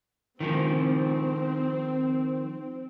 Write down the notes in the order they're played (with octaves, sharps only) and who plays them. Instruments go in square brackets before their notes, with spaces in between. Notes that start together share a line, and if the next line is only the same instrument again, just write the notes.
[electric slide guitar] D#3 F3 [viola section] C4